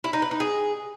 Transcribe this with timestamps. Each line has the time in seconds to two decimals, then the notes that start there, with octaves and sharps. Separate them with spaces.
0.04 E4
0.13 D#4
0.22 B4
0.31 D#4
0.40 G#4